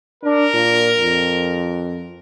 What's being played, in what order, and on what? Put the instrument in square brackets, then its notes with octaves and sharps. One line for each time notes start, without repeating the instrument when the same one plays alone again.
[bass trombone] D4 [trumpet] A#4
[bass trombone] A#2
F2